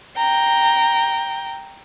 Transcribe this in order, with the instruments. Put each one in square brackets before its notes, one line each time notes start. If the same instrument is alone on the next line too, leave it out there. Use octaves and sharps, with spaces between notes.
[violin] G5 A#5